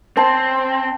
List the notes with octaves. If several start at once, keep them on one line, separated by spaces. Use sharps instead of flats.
C4 C5 A5